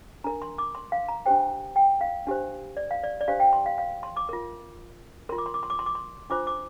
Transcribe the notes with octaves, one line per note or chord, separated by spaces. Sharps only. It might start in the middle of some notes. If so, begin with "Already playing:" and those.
D4 A#4 A#5
C6
D6
C6
F5
A#5
D4 G4 C5 G5
G5
F5
D4 G4 C5
D5
F5
D5
D5
D4 G4 C5 F5
G5
C6
F5
F5
C6
D6
F4 A#4
F4 A#4 C6
D6
C6
D6
C6
D6
C6
D6
C6
D4 F4 C5 D6
D6